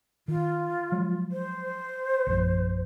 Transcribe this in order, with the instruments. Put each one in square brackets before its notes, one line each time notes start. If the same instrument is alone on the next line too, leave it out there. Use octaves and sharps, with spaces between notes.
[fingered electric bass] D#3 [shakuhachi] F4
[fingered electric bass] F3 F#3 G#3
[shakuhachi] C5
[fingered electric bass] A#1 F#2 F3